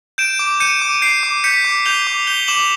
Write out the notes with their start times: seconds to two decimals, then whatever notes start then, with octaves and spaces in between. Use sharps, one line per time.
0.18 G6 D7 E7
0.39 D6
0.60 G6 C#7 D#7
0.82 D6
1.02 G6 C7 D7
1.23 D6
1.44 G6 B6 C#7
1.65 D6
1.85 G6 F7 G7
2.07 D6
2.27 G6 F7 G7
2.48 D6 E7 F#7